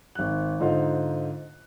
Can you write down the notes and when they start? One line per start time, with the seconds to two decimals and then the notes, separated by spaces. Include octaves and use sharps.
0.15 G#1 F#6
0.60 G#2 D3 D#4 F4 C5 F5